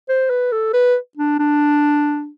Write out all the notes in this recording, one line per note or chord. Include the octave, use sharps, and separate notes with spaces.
C5
B4
A4
B4
D4
D4